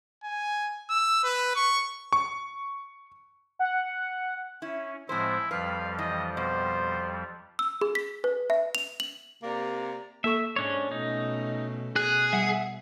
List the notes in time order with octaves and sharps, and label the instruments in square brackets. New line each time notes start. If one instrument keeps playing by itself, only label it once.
[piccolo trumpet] G#5
E6
B4
C#6
[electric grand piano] C#6
[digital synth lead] F#5
[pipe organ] C#4 [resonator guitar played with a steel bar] E4
[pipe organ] A2 F3 G#3 [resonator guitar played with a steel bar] C4 C5 [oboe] E4
[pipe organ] F2 F3 G3 [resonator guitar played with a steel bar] B4 [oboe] F5
[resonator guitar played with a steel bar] E3 [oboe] D#5
[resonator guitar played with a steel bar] B2 [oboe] C5
[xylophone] E6
G#4
B6
B4
E5
F7
F#7
[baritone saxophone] C3 [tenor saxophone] A#3 [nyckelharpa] D5 A#5
[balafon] A#3 A4 C#6 [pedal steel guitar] E5
[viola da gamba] G#2 [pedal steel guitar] C#4 D4 C#5
[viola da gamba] B2 A3 C#4 [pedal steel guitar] D#4
[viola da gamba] B2 [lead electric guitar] G#4 [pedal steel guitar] F#6
[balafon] G3 [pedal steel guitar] E5 F#5